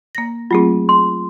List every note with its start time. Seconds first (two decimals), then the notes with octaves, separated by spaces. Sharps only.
0.15 A#3 A#6
0.51 F#3 A3 C4 F4 G#4
0.89 C6